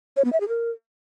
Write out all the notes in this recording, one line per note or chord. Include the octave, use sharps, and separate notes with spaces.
C#5
B3
E5
G#4
A#4